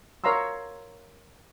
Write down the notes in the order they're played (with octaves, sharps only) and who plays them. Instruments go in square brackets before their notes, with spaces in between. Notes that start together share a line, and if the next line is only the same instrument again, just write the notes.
[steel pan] A#4 C#5 F5 A#5 C6 E6